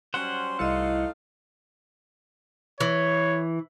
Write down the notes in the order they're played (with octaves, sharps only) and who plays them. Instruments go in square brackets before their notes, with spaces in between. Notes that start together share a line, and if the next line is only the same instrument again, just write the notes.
[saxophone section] F#3 G3 C#4 [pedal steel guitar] C5 F#5
[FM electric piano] C2 G3 C#7 [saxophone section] A3 D#4 F5 [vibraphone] E4 D#5
[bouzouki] E3 [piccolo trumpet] C#5